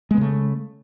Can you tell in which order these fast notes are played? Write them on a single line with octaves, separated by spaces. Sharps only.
G#3 B3 C#3 A3